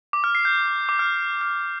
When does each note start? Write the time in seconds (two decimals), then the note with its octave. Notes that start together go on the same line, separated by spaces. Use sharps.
0.13 D6
0.24 F6
0.35 C7
0.45 G6
0.89 D6
0.99 F6
1.41 F6